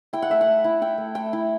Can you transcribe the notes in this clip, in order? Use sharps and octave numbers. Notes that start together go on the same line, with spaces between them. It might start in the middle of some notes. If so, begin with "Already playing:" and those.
E4 G5
F#5
A3 E5
F#5
A3
E4
E4 G5
A3
A3 G5
E4